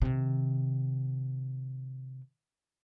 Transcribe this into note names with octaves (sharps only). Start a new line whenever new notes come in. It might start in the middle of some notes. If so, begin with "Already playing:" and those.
C3 D#3